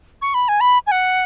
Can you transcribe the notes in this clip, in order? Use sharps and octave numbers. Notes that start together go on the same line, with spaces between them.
C#6
B5
G#5
B5
G#5
F#5